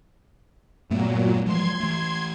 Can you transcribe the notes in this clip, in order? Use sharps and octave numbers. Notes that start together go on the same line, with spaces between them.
G2 A#2 F#3 A3 B3
E3 F3 G#3 C6 G#6
E3 A3